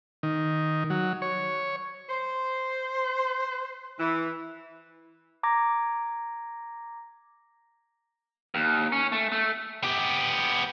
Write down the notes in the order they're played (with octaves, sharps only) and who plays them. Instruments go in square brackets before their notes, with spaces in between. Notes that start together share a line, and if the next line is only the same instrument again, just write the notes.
[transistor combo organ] D#3
F#3
C#5
[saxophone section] C5
E3
[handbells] A#5 D6 G#6 A#6
[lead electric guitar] D#2
C#4
A3
A3
[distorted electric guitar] B3 G4